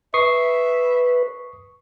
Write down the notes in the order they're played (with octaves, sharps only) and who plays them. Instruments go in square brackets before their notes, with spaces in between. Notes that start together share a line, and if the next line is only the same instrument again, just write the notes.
[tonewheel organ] B4 [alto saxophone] E5 [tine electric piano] C#6 D#6 C7